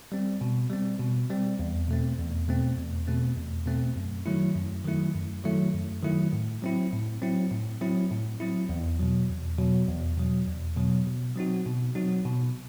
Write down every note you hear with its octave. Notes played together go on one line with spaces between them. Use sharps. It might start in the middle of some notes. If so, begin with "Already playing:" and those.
G3 C4
B2
G3 C4
B2
G3 C4
E2
B2 A3 C4
E2
B2 A3 C4
E2
B2 A3 C4
E2
B2 A3 C4
F#2
D#3 F#3 A3 E4
F#2
D#3 F#3 A3 E4
F#2
D#3 F#3 A3 E4
F#2
D#3 F#3 A3 E4
A2
F#3 C4 E4
A2
F#3 C4 E4
A2
F#3 C4 E4
A2
F#3 C4 E4
E2
B2 F#3
E2
B2 F#3
E2
B2 F#3
E2
B2 F#3
B2
F#3 C4 D#4 F#4
B2
F#3 C4 D#4 F#4
B2